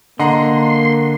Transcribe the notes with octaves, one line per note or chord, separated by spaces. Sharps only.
D3 A#3 D#5 F#5 A#5 C6